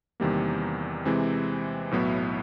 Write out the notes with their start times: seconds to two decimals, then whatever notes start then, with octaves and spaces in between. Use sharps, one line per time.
0.20 E2 C3 D#3 G3 A#3
1.05 C3 E3 G#3 C4
1.91 B1 A2 F#3 B3 E4